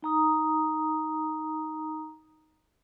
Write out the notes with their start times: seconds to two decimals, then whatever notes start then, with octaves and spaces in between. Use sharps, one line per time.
0.03 D#4 A#5 D#6